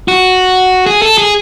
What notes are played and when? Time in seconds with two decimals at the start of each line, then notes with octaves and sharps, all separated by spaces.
0.08 F#4
0.87 G#4
1.02 A4
1.18 G#4